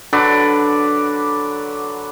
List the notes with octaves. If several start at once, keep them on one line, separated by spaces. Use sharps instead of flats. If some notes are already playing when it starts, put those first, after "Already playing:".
D3 F#3 B4 D5